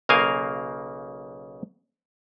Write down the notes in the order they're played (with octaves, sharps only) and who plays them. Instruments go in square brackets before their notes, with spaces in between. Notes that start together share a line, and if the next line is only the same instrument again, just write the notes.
[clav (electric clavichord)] B1 C#3 A#3 A#4 F5 G#5